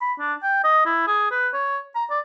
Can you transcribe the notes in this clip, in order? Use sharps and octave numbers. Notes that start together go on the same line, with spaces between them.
B5
D4
G5
D#5
E4
G#4
B4
C#5
A#5
D5